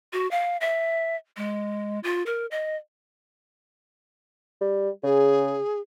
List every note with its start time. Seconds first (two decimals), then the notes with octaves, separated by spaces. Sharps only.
0.13 F#4
0.31 F5
0.61 E5
1.37 G#3
2.03 F4
2.26 A#4
2.51 D#5
4.61 G3
5.03 C#3 G#4